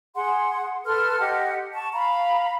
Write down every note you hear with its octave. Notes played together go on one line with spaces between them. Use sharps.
G#4 F#5 C6
A4 B4 C6 F6
G4 D#5 F#5
A5 C#6
F5 A#5 B5